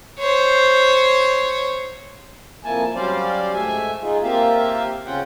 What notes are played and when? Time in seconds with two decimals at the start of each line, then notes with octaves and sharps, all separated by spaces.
0.19 C5 C#5
2.64 F2 F3 A#3 E4 G#5 A5
2.95 F#3 G3 C#4 C5 D5 F5
3.54 G#2 A3 E5 G#5
4.02 G#3 D#4 F4 G#4
4.23 A#3 C4 F4 G4 E5 F5
5.06 C#3 C4 C#4 F4 F#5 G5